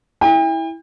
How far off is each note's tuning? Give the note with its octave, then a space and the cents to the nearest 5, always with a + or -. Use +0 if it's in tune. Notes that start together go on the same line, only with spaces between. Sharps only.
E4 -10 G5 +40